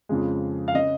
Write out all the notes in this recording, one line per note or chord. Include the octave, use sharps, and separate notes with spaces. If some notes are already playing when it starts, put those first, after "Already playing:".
F2 C#3 F3 G#3
F5
C#3 D#5